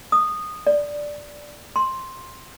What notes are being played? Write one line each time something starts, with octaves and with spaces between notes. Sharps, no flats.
D#6
D5
C6